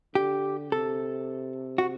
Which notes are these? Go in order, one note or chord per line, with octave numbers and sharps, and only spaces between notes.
D3 G4
C3 A4
F#4